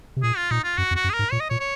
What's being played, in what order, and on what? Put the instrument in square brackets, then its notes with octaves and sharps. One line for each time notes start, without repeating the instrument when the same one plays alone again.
[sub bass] C3
[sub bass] A#2 [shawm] G#4
[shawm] F4
[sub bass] A#2 [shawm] D#4
[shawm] F4
[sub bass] F#2 [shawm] F#4
[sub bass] F2
[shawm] F#4
[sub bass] F#2
[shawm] G#4
A#4
[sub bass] G#2
[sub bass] A#2 [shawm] C#5
[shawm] D#5
[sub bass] A#2 [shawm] C#5
[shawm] C#5